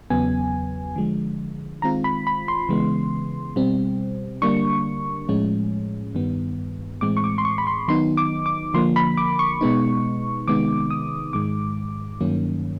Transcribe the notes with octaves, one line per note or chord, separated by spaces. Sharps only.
E2 C#3 F#3 B3 G#5
D3 F3 G#3
D#3 G#3 C4 F4 A#5
B5
B5
C6
C#3 E3 G#3 B3
B2 G3 C4
D3 G3 A#3 D4 C#6
A2 F3 G#3 C#4
G2 D#3 G3 B3
A2 E3 G#3 C4 D6
C#6
D6
C6
C#6
B5
C6
D#3 F#3 B3 D#4 C6
D6
D6
D3 F3 A#3 C6
B5
D6
C#6
B2 G#3 B3 D#4
C3 D#3 G#3 B3 D#4 D6
D#6
G#2 D#3 G#3 D6
G2 D#3 F#3 A#3 C#4